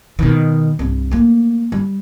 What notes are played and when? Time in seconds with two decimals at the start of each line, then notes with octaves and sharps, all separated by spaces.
0.19 B2 D#3
0.79 C2 G2
1.11 A3 A#3
1.72 G3